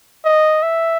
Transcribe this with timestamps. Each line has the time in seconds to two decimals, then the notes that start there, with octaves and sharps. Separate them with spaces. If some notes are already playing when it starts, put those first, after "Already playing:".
0.25 D#5
0.63 E5